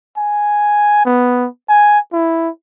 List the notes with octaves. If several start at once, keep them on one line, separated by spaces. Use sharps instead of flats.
G#5
B3
G#5
E4